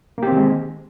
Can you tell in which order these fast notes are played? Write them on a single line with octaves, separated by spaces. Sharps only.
A#3 G4 C4 D#3 G#3